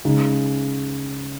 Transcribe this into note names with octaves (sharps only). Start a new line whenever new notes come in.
C#3 G#3 D#4